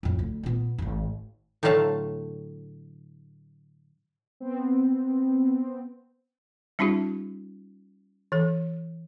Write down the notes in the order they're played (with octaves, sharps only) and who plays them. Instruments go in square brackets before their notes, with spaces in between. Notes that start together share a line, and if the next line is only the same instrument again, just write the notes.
[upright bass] F2 A2
D2
A#2 B3
D#1 G#1
[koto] A2 D3 F#3 A3 F5 A5
[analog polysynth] B3 C4
[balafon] G3 C#4 D#4 F4 G4
E3 A4